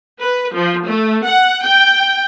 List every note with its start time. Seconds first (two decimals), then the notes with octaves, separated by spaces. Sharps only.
0.23 B4
0.55 F3
0.88 A3
1.27 F#5
1.65 G5